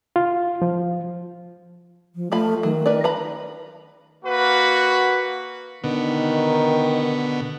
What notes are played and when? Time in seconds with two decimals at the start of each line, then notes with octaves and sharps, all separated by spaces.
0.16 F4
0.62 F3
2.16 F3
2.32 F3 A3 F4 B5
2.63 D#3 F#3
2.86 A#4 B4 D5
3.04 B4 A#5 B5
4.24 A#3 F#4 B4
5.84 B2 D3 D#3 B3